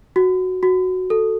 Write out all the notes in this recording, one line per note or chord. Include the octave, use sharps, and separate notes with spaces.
F#4
F#4
A4